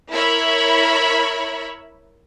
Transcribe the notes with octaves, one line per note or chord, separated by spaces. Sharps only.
E4 A#4 C#5 E5 B5